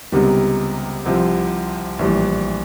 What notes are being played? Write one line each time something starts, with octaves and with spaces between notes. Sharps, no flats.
C#2 C3 D#3 G3 B3
C2 C3 F3
A#1 A2 E3 G3